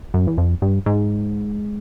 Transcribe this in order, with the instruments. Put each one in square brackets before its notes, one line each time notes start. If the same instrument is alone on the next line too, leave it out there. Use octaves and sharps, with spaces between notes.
[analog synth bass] F#2
E2
F2
G2
G#2